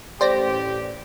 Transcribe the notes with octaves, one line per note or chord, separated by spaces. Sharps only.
A1 G4 C5 D5 A#6